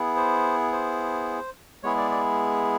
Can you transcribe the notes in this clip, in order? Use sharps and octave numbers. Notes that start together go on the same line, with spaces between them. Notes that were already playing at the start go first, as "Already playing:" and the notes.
Already playing: B3 E4 G#4
C5
C5
G#3 B3 E4 G#4 C#5
D5
D5